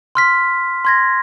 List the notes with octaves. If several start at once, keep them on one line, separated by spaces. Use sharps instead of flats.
C6 F6 B6
C6 G#6 A#6